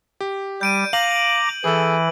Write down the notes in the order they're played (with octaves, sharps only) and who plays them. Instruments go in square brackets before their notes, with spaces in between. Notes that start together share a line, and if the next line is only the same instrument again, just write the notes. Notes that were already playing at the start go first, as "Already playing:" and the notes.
[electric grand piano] G4
[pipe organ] G3 [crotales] G6 D7 D#7
[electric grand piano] F5 [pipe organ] A#5 D6 [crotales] F#7
[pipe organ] E3 [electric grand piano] G#4 A4